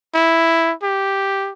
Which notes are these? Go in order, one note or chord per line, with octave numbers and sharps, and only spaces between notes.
E4
G4